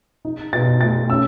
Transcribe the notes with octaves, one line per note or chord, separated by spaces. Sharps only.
D#4
B2 A6
A3 A6
C#4 E6